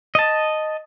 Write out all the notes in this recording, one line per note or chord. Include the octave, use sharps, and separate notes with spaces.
D#5 A5